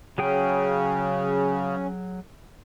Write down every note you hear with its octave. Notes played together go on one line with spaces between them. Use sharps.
C#3 F#3 C#4 G#4 G5